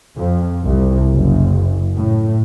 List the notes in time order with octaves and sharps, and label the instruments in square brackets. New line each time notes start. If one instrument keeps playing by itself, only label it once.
[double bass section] F2
C2
F#1
A2